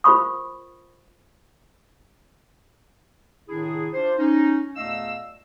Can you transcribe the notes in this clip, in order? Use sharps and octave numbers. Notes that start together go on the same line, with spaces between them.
F4 A#4 C5 B5 C#6 D#6
A2 C3 D#3 D4 E4 G#4
D4 F4 C5
C#4 D#4
E2 A#2 A3 D#5 F5 E6